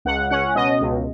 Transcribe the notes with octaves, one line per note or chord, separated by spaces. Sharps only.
C#2 F#5
C#4 F#5
B2 D#5
C#2